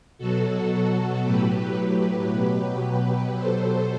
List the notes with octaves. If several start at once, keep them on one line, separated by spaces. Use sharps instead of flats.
B2 F#3 F#4 A4
F#4 A4
A2 F#3 G4 B4
G4 B4
B2 F#3
B2 F#3 A4 C5